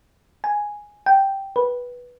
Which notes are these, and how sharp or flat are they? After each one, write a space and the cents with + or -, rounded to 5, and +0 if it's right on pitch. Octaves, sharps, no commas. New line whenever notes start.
G#5 +0
G5 -5
B4 -10